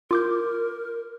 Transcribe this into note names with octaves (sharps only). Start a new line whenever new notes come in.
F4 A#4 D6 G6